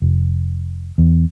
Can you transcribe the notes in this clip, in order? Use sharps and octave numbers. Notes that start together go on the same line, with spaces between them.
F1
E2